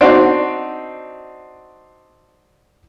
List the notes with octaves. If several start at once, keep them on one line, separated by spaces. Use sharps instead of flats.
C4 D4 D#4 F#4 D5